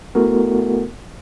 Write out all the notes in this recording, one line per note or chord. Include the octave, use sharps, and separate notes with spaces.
A3 B3 E4 F#4 A4 A#4